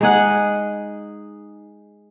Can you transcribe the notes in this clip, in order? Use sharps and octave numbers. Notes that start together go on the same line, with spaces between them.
G#3 D#4 G#4 F#5